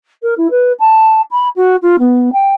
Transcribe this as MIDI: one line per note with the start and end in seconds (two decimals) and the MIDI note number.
0.22 0.34 70
0.37 0.47 64
0.50 0.72 71
0.79 1.21 81
1.31 1.48 83
1.56 1.76 66
1.82 1.96 65
1.99 2.29 59
2.32 2.54 79